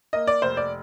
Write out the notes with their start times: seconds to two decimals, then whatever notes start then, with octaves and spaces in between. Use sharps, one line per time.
0.13 A#3 D#5
0.27 D5
0.42 F1 C5
0.57 D5